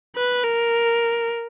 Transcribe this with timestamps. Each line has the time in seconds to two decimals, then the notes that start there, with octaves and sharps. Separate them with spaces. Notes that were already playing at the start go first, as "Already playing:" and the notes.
0.16 B4
0.43 A#4